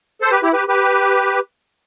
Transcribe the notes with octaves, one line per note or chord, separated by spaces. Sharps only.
A4 C5
G4 B4
E4 G4
G4 B4
G4 B4